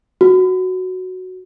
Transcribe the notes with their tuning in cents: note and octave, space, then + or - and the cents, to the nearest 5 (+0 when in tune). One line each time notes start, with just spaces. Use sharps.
F#4 +0